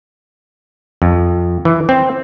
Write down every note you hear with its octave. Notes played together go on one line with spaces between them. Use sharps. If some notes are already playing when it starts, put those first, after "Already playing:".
F2
E3
C4